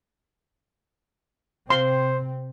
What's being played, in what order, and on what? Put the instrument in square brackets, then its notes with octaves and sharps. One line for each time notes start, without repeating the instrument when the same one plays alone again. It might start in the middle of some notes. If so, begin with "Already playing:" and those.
[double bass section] C3 C4 [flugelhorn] C5 [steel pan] C6